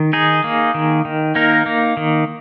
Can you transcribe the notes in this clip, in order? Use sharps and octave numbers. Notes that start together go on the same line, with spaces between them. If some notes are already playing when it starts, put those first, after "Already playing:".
Already playing: D#3
D#4 G#4
A#3
D#3
D#3
A#3 D#4 A#4
A#3
D#3